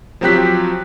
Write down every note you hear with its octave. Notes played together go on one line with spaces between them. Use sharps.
F3 F#3 C4 G4 F#6 B6